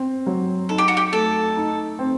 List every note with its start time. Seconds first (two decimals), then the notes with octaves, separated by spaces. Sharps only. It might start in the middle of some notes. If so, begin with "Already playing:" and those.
Already playing: C4
0.27 F#3
0.69 D#4 A4
0.78 G4
0.88 F#4
0.97 G4
1.12 A3 A4
1.56 D#4
1.99 C4